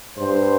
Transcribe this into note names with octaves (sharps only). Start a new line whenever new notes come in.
G2 C5